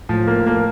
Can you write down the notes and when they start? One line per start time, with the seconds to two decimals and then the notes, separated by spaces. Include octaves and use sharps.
0.09 A2 F3
0.27 A#3
0.47 A#3